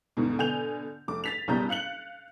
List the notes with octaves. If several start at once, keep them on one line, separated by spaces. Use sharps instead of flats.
D2 G#2 B2
B2 D3 G#5 G6 F7
F1 D6
A6 B6 F7
F#1 B2 G3 A5 A#5 G6
F5 F#6 C#7 F#7